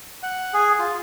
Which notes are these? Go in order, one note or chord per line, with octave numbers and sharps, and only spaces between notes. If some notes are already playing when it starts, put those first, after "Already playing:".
F#5
G#4
F4